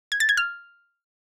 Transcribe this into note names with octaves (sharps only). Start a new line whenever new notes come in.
G#6
A6
G#6
F6